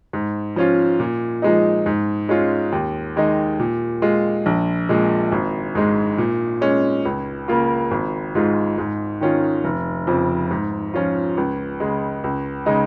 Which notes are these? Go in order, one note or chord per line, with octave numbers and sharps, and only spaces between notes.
G#2
F3 C#4 F4
A#2
F3 G#3 D#4
G#2
G#3 C#4 F4
D#2
D#3 G#3 D#4
A#2
G#3 F4
A#1
A#2 G#3
G#1
G#2 G#3
A#2
G#3 C#4
C#2
C#3 A#3 F4
G#1
G#2 G#3 F4
G#2
D#3 C#4 F4
F1
F2 C#3 F3
G#2
F3 C#4 F4
C#2
C#3 G#3
C#2
C#3 G#3 D#4